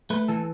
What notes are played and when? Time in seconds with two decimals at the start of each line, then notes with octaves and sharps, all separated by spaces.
0.10 A3 B4
0.28 E3 A4